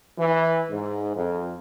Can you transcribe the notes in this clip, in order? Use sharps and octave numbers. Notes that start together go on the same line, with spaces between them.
E3
G#2
F2